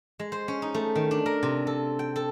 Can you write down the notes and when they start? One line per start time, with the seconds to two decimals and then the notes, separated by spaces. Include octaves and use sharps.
0.19 G#3
0.32 C5
0.48 C#4
0.62 D#4
0.74 A3
0.95 D#3
1.11 D4
1.26 A#4
1.43 C3
1.67 A4
1.99 G5
2.16 A4